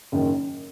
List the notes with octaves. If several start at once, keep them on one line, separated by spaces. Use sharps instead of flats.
F#1 F#2 D#3